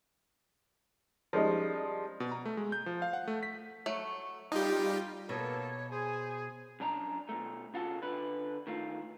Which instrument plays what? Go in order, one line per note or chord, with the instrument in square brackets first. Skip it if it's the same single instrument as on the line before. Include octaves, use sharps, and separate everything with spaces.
[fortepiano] F3 G3 G#3 C#4 D#4
[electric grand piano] B2
A#5
A3
G#3
G6
F3
F5
F#5
A3
B6
[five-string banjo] F#3 A3
[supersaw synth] G3 F4 [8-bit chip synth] D#4 G4 [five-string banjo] D#5
[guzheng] B2 [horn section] A#3 A4 [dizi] C#5
[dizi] G#4 [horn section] C5 G#5
[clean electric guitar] F#2 D4 A#5
B2 A3
C#3 F4 F#4 A4
D3 B4
D#3 A3 F4